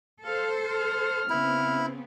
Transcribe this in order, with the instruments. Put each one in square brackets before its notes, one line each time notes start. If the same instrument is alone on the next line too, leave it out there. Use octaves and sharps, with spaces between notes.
[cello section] A4 C5 [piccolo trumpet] F5
[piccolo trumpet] F6
[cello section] C#3 B3 C4 [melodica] E4